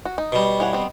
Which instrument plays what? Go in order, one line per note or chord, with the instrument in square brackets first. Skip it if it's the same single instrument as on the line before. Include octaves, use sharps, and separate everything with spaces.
[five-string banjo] F#4
D#4
[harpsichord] B2 G3
[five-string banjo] E3 C#5 F#5
B3 C4